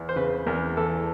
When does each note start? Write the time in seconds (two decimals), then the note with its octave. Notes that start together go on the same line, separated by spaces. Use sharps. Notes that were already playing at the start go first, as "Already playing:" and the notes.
Already playing: E2
0.09 C5
0.16 C#3 B4
0.47 E2 A#4
0.77 E3 A4